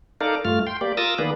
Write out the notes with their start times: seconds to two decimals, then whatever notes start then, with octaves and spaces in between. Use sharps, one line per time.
0.21 D#4 A4 A#4 D5 F5
0.45 G2 A3 F4 F6
0.67 G5 C6
0.81 A#3 G4 D5
0.97 F4 A#4 D#6 E6 A6 A#6
1.18 D#3 A#3 B3 G#4 B4 D5